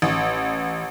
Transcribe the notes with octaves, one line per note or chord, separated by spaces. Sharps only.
A1